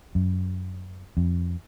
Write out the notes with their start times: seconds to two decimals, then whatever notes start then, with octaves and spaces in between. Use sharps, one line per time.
0.15 F#2
1.17 F2